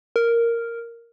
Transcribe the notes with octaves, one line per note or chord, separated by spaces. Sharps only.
A#4